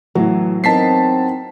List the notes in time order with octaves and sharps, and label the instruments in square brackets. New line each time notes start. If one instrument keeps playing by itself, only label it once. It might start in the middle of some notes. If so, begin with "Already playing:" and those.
[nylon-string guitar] A2 B3 [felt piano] E3 F#3
[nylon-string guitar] B3 D#4 A#4 [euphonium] C4 [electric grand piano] A5 B6 C7